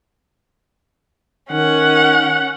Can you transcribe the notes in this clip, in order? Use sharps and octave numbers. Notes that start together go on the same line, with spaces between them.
D#3 C#4 F#5